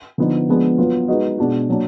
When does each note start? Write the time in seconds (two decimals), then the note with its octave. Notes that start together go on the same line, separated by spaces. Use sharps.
0.18 D3 F3 B3 D#4
0.49 F3 G#3 B3 D4
0.78 F#3 B3 F4 B4
1.08 G#3 D#4 F#4 B4 D#5
1.38 B2 G#3 D4 F#4
1.69 A#2 F#3 D4